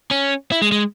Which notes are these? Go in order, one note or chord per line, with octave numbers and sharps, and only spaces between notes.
C#4
E4
G#3
G#3